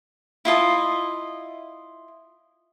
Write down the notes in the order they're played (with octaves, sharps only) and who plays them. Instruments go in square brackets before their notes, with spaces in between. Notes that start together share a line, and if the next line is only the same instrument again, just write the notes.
[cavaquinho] E4 F4 D#5 A5